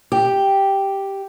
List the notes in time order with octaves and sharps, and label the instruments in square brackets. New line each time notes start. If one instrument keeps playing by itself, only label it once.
[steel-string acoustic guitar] G4